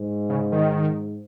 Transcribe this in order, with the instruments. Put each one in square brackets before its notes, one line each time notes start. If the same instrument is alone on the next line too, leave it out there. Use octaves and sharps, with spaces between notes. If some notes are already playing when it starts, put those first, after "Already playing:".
Already playing: [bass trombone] G#2
[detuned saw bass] C#3
D#3